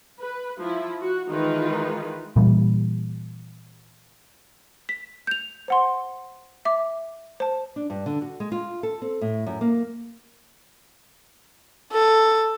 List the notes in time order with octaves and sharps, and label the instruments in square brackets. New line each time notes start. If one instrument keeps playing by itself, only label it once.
[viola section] B4
F3 E4
F#4
D#3 E3 G#3 D#4 F4 B4
[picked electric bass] A#2 E3 G3
[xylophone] B6
G6 F7
C5 F#5 C6
E5 D6
C5 A5
[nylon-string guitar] D4
G2
D3
F#4
G#3
F4
A4
C4
A2
F#2
A#3
[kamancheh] A4